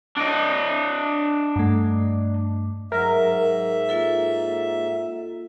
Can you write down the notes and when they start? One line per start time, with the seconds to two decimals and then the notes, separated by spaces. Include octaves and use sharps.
0.17 D4 D#5
1.56 G2 A3
2.92 G#2 F#3 A#4 E5
3.89 A#3 F4 A4